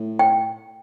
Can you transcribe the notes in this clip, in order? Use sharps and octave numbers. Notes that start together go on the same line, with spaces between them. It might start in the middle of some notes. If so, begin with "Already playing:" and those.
Already playing: A2
G5